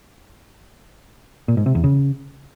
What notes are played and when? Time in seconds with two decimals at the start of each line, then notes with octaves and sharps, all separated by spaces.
1.48 A#2
1.57 G#2
1.66 C3
1.75 E2
1.84 C#3